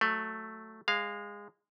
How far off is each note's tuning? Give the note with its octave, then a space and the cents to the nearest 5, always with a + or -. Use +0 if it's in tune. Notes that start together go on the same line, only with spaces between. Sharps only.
F#3 +5 A3 +0
G#3 -20 F5 +0